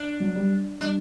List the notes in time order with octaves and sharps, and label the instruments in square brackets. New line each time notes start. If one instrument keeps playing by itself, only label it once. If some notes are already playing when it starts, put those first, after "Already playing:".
Already playing: [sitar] D4
[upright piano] F#3
G3
[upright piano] G3 [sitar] D4